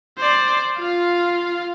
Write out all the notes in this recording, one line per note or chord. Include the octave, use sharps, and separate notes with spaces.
C5 D5
F4 F5